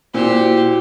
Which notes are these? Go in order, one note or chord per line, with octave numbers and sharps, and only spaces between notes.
A#2 E4 F#4 G4 C5